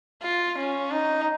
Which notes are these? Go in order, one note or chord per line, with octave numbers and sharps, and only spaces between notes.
F4
C#4
D#4